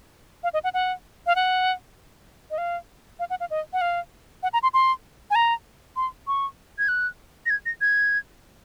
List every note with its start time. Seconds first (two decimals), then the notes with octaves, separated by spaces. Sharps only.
0.43 F5
0.54 D#5
0.64 F#5
0.74 F#5
1.27 F5
1.36 F#5
2.51 D#5
2.58 F5
3.19 F5
3.30 F#5
3.40 F5
3.50 D#5
3.73 F#5
3.81 F5
4.43 F#5
4.53 A#5
4.63 C6
4.74 C6
5.31 G#5
5.35 A#5
5.96 C6
6.27 C#6
6.79 G#6
6.88 F#6
7.46 A#6
7.50 G#6
7.66 A#6
7.81 G#6